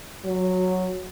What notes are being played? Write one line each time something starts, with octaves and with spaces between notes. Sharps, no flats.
F#3